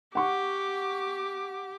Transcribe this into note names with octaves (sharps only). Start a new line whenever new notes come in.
G4 F#5 C#6 D6